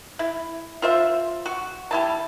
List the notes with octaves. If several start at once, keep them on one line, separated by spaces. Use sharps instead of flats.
E4
F4 C5 E5
F#4
G3 E4 A5